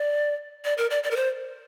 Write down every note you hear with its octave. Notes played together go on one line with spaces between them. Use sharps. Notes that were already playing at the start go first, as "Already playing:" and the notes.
Already playing: D5
D5
A#4
D5
D5
A#4
C5